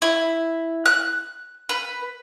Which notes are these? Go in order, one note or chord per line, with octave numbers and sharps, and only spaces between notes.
E4
F#6
B4